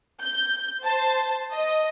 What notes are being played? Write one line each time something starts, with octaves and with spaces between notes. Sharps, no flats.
G6
C5 A5
D#5